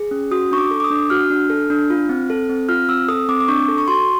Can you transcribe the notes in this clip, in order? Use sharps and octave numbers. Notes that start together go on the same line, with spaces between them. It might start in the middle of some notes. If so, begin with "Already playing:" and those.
Already playing: G#4
C#4
F#4 D#6
D4 C#6
D6
A4
D6
D#6
D4
F#4 F6
D4
A4
D4
F4
C4
A4
C4
F4 F6
C4 E6
A4 D#6
C4 D6
D6
D4 C#6
A4
C#6
F#4 C6